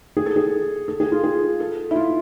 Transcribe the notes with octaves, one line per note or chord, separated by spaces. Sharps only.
G#4
A4
G#4
A4
G#4
F4
G#4
A4
E4
F4